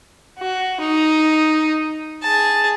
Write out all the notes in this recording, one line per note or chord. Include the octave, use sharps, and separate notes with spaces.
F#4
D#4
G#4 A5